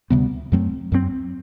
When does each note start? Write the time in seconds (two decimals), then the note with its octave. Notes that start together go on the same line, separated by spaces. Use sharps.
0.10 D2 C3 G3 B3
0.52 F#2 F#3 A3 C4
0.92 F#2 F#3 A3 C4